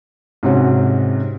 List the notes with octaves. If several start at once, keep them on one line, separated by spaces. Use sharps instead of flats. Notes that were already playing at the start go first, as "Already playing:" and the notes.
G#2 C3 C#4 F#4